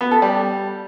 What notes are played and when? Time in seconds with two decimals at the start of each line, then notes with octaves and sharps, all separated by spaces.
0.01 B3
0.11 A4
0.22 G3